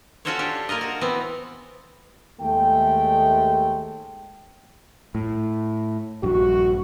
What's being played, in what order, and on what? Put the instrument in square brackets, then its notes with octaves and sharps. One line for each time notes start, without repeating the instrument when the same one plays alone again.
[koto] C#4 F4 F#4 A4 C5 C#5
D4 G4
A#3 F4 A#4 D#5
F#4
E3 B3 C4
[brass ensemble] D#2 G#3 A3 G5
[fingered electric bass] A2
[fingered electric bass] A#1 G2 [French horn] F#4